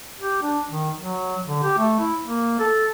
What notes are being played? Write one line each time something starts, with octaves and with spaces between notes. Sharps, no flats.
G4
D4
D#3
F#3
D3
G4
A3
E4
A#3
A4